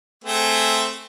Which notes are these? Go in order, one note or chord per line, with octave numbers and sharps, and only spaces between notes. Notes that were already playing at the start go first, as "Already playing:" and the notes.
A3 C4 G#4